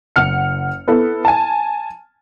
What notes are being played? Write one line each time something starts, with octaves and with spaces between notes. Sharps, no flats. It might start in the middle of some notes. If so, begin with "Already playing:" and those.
F#1 F#5 F6 C#7
B3 E4 A4 B4
G#5 A5